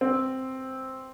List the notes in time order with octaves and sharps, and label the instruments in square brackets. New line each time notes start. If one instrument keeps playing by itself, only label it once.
[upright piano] C4